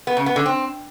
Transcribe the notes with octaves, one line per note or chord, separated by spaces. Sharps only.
B3
C#3
B3
D3
C4